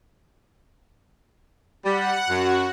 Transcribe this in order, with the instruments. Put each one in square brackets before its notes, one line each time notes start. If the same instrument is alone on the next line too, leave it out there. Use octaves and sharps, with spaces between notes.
[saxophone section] G3 [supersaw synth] F#5
[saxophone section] F#2 [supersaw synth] F#4